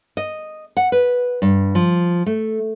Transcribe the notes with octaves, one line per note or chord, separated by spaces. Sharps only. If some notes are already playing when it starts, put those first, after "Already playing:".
D#5
F#5
B4
G2
F3
A3